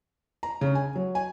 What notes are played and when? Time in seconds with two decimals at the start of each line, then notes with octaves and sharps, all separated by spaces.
0.43 A#5
0.61 C#3
0.75 G#5
0.95 F#3
1.15 G#5